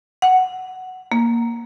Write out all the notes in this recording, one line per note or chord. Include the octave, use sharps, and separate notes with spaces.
F#5
A#3